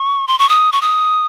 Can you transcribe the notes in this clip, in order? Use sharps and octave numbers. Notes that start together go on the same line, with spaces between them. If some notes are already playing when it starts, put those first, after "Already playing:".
Already playing: C#6
C6
C#6
D#6
C#6
D#6